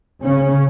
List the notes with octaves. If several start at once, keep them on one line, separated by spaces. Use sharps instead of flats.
C#3 C#4